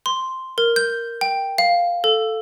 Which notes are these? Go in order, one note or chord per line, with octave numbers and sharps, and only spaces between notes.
C6
A#4
G6
G5
F5
A4